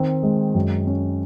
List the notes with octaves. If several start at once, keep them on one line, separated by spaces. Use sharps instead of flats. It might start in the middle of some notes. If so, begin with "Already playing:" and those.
Already playing: D#3 C4
G#3
F#2
C#4